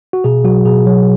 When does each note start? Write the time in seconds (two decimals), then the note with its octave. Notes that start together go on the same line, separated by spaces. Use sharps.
0.13 F#4
0.24 B2 G#4
0.44 F#3 F#4
0.65 B2 G#4
0.87 F#3